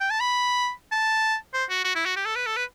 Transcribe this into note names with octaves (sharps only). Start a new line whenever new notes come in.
G5
A5
B5
A5
C5
F#4
F#4
E4
F#4
G4
A4
B4
A4
B4